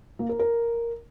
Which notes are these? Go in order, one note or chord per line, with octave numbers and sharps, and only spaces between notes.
A#3
A#4
A#4